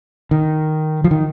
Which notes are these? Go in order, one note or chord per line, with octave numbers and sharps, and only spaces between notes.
D#3
F3
D#3